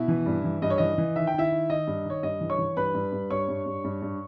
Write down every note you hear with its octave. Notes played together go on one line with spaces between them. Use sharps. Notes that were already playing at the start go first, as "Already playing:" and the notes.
Already playing: B2 E4
E3
G2
E3
G2 D#5
C#5
E3 D#5
E3
D#3 E5
G5
D#3 E4 E5
D#3
D#3 D#5
G2
D#3 C#5
G2 D#5
E3
C#5 C#6
E3
G2 B4 B5
G2
G2
G2 C#5 C#6
G2
G2
G2
G2